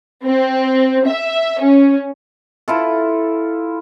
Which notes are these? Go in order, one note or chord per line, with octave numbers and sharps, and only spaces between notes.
C4
E5
C#4
E4 F4 A4